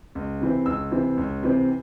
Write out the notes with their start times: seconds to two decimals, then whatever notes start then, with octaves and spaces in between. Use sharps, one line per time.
0.15 C#2
0.40 C3 E3 C4
0.66 C#2 E6
0.92 C3 E3 C4
1.17 C#2
1.43 C3 E3 C4